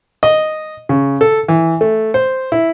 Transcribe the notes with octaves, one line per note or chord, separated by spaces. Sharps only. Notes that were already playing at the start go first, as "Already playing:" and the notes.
D#5
C#3
A4
E3
A3
C5
E4